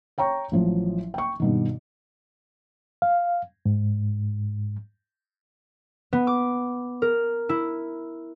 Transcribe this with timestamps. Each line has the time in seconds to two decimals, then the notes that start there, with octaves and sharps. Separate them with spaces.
0.18 C#5 G5 A#5 C#6
0.52 A1 F3 F#3
1.14 G5 C#6
1.40 G2 B2 D#3
3.02 F5
3.66 G#2
6.13 B3
6.27 D6
7.02 A#4
7.49 E4